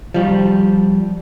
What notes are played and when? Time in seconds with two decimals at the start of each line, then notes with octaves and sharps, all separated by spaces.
0.14 F3 G3